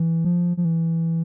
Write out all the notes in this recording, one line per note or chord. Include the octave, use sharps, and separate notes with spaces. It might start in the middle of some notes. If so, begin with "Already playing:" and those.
Already playing: E3
F3
F3
E3